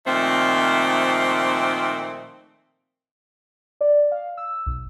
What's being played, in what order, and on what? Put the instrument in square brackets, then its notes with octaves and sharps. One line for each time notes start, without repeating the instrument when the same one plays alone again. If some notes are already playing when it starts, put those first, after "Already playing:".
[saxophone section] A#2 D#3 F3 A3 C4
[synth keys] D5
F5
E6
B1